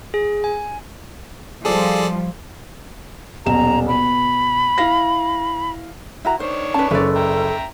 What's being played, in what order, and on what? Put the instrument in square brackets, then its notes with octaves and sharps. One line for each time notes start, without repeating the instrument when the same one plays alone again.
[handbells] G#4
G#5
[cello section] F3 G3 [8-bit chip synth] G#4 A4 D5
[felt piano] D#1 B1 E7 [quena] A#5
[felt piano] B2 [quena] B5
[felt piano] E4 F5 A#6
[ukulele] E4 F#4 A#5
[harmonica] D#3 D4 C#5 [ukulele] C5
[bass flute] C#4 [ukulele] B4 A5
[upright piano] F#1 [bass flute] A4 [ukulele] B4 D5
[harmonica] E5 G5 A#5